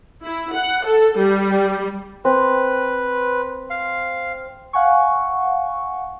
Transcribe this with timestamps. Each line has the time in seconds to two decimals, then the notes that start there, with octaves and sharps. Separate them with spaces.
0.22 E4
0.54 F#5
0.85 A4
1.19 G3
2.25 C4 B4
3.70 F5
4.73 F5 F#5 G#5 C#6